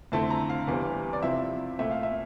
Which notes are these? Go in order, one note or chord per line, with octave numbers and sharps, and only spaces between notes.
F2 D3 A3 C4 E4 A5
A#5
F5
E2 E3 G3 C4 F5
D5
C3 F3 C4 E4 E5
A#2 A3 C4 E5
F5
E5